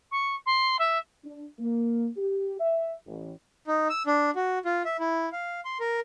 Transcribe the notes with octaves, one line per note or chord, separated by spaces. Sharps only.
C#6
C6
E5
D4
A#3
G4
E5
A1
D#4
E6
D4
F#4
F4
E5
E4
F5
C6
A#4